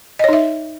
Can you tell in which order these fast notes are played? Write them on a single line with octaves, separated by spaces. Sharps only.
D#5 C#5 D#4 E5